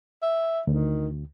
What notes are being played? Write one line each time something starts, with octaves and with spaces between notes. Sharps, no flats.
E5
D2 D#3